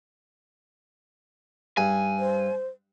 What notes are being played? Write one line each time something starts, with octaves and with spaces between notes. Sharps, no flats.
G2 G#5
C5